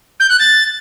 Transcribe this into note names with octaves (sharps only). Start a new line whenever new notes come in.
G6
F#6
A6